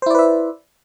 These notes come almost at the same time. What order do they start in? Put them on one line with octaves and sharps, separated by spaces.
C5 E4 D5 B4 E5